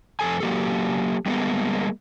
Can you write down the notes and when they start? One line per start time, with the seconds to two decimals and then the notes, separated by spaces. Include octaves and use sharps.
0.20 F2 E3 A4 G#5
0.40 F#3 A#3 G4 A4
1.26 G3 G#3 A#3 B3